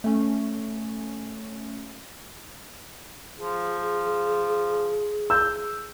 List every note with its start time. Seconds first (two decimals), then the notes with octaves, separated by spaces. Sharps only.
0.04 A3 C#4
3.39 F3 G#4
5.30 E6 G6